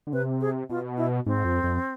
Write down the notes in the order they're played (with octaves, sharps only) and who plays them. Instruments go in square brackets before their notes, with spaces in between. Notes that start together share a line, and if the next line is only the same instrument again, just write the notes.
[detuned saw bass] D3
[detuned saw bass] C3 [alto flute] B4
[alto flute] G#4
[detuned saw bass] B2 [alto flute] F4
[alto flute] E4
[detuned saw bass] G#2 [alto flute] C4
[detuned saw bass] F2
F2